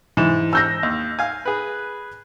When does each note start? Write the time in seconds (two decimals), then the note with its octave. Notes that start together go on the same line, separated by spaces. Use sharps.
0.17 G#2 E3 E7
0.53 E6 G6 A#6
0.83 D#2
1.19 F5 G#5
1.45 G#4 B4